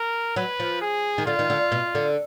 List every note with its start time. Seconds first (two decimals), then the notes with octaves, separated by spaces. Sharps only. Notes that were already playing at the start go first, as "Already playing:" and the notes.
Already playing: A#4
0.36 F#3 B4
0.60 F3
0.82 G#4
1.18 D#3
1.26 D3 F4
1.39 D#3
1.50 D3
1.72 B2
1.95 D3